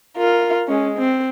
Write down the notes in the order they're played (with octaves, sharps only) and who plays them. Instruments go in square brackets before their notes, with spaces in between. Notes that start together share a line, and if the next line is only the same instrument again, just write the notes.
[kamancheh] F4 A#4
G#3 C#4
C4